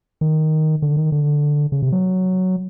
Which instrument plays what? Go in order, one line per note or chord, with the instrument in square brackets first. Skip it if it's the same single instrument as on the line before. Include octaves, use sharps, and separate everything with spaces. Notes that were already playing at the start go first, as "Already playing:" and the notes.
[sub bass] D#3
D3
D#3
D3
C#3
C3
F#3